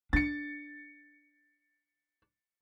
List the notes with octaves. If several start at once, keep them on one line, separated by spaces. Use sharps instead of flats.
D4 A6 C#7